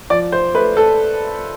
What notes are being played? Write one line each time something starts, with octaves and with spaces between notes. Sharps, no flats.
F3 D5
C5
A3 B4
A4